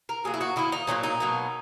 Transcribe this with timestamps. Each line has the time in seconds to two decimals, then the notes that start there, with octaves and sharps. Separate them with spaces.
0.09 A#4
0.24 A#2 F#3 A#3 G#4
0.34 E4
0.41 F#4
0.56 D#3 A#3 E4
0.72 D#4
0.87 A#2 F#3 A#3 C#4
1.03 D#4
1.20 B2 F#3 A#3